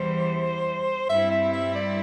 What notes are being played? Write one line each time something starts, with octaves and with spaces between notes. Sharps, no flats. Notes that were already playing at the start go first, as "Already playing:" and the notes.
Already playing: E2 E3 G3 C5
G2 G3 C4 E4 E5
E5
E5
D5